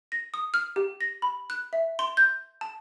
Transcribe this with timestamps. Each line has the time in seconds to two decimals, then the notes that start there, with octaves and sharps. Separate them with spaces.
0.12 A#6
0.34 D#6
0.54 F6
0.76 G4
1.01 A#6
1.22 B5
1.50 F#6
1.73 E5
1.99 C6
2.17 G6
2.61 A5